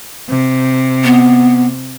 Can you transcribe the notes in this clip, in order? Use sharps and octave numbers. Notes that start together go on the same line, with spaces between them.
C3
B3